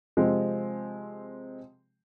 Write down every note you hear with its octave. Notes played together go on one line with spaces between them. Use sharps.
C3 F3 G#3 C4